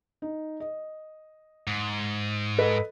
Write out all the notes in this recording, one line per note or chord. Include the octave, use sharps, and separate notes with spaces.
D#4
D#5
G#2
A4 B4 D#5